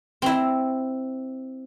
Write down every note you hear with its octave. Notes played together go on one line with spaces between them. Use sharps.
C4 E4